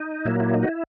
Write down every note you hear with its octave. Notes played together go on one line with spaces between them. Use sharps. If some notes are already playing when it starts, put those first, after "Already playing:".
Already playing: D#4
A#2 F#3 A#3 E4
E4
D#4
F#4
E4